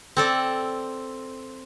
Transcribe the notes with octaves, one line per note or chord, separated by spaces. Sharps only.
C4 A4 D5